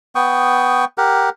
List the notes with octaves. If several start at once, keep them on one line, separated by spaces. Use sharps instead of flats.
B3 G5 C#6 D#6
G4 A#4 F#5